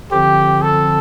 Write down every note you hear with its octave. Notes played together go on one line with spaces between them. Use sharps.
D3 F3 C4 F4 G4
A4